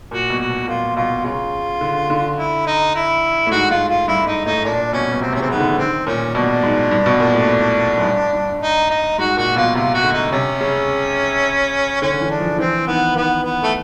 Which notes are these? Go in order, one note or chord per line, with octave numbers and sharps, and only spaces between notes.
A#2 F#4
B2
F#4
B2
A#2 F4
B2 F4
C#3 F4
D3
D3
E4
D#4
E4
A2
G#2 F#4
G#2 F4
F4
G2 E4
G#2 D#4
A2 D#4
A#2 D4
B2 C#4
B2
C3 C4
C3 C#4
C#3 C4
D#3 B3
D3
D#3 C4
A#2 C#4
B2 D4
G#2
G2
B2
A#2
A2
F#2
G2
G2
D#4
D#4
G#2 F#4
A#2 F#4
B2 F4
C3 F4
F#4
D3
D#4
C3 C#4
C#3
D3 C#4
E3
D4
F3
E3 C4
D#3 B3
D#3 B3
B3
A3